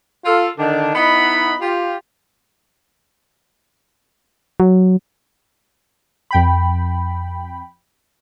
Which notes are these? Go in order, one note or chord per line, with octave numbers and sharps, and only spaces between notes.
F4 A4 F5
D3 D#3 D4
B3 D#4 E4 D#5 F#5 B5
F4 G4
F#3
F2 G5 B5